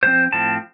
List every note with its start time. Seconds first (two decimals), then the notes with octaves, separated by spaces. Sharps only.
0.03 A2 F3 C4 C5
0.32 A2 F3 C4 A5